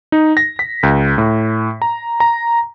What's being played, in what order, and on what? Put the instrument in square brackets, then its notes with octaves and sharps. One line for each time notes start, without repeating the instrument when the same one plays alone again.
[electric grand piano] D#4
A#6
B6
C#2
A2
A#5
A#5